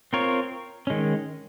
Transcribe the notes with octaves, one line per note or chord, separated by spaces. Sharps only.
C4 F4 A#4 C#5
D#3 G#3 C#4